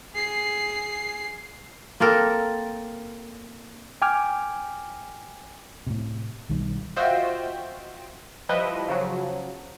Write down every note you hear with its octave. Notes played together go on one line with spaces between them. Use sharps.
G#4 C7
A#3 C4 A4 A#4
G5 G#5 D6 F6
A2 C3
B1 D#3 G3
F4 F#4 C5 D#5 E5 G5
F3 G3 E4 B4 D#5 E5
C#3 F3 F#3